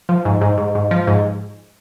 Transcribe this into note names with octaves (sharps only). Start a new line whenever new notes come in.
F3
G#2
G#2
G#2
G#2
F3
G#2